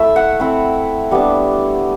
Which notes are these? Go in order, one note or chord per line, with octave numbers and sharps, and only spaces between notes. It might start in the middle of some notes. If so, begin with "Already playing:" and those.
Already playing: A3 E4 E5
F#5
A3 C4 E4
G3 B3 D4